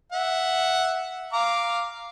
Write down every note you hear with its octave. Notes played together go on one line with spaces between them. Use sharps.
E5 F#5
F5 A#5 D6